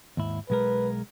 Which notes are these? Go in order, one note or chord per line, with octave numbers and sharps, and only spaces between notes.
D#2 G#2 E4
B1 G#3 A#4 B4